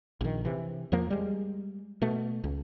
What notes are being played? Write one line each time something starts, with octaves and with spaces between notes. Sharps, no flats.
A#1 D#3
C3 E3
E2 F3 A#3
G3 G#3
B2 A3
C#2